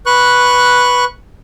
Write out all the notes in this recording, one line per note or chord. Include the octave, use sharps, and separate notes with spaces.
B4 C#6 F#6